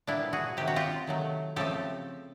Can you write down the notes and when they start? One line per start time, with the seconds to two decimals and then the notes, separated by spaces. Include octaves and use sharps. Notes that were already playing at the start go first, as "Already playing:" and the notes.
0.07 A#2 G3 B3 D4 E4
0.33 F#4 G#4
0.57 C3 D#3 F#3 G4
0.68 F#4
0.76 F4 G4
1.07 D#3 F#3 A3
1.56 C#3 F3 A3 C4 G4 A4